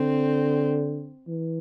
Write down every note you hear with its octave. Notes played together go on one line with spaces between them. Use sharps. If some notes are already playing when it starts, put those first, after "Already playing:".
Already playing: D3 C4
E3